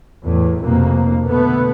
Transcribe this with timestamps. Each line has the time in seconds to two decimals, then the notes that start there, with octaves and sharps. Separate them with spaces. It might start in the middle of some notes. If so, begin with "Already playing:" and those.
0.23 E2 A2
0.59 F1 F2 B2 A#3
1.25 B2 D3 A3 B3